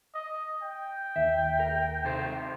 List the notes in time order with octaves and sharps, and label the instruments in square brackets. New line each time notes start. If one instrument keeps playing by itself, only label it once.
[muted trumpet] D#5
G5
[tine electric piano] D#2 D#3 [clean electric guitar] E5
[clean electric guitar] A#4
[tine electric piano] C3 [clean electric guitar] D#3 A4 C5